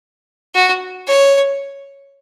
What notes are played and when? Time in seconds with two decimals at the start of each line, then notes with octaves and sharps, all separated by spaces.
0.55 F#4
1.08 C#5